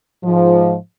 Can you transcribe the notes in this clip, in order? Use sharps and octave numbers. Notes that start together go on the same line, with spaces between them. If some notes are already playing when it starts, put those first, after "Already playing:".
G#2 F3